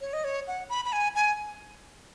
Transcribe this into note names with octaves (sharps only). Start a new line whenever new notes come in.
C#5
D#5
C#5
F#5
B5
B5
G#5
G#5